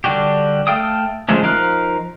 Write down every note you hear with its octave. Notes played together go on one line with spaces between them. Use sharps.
D3 G3 D4 F#4 G4
A3 A4 F5 G5 D#6
D3 F3 G#3 A3 C#4
F3 D#4 A#4 F5 F#6